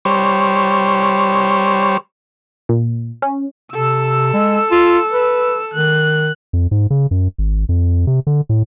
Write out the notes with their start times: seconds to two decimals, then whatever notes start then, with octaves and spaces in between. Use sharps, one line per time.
0.05 G3 C5 C#5
2.69 A#2
3.22 C#4
3.72 C3 A4 E6
4.33 G#3
4.72 F4
5.12 B4
5.74 D#3 F#6
6.53 F2
6.71 G#2
6.90 C#3
7.11 F#2
7.38 G#1
7.69 F2
8.07 C3
8.27 D3
8.49 A2